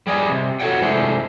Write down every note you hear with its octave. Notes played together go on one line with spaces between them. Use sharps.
G3 G#4 D5 D#5
C3
F#4 A4 B4 C#5 F#5 G5
C3 G#3 A3 D4 E4 C5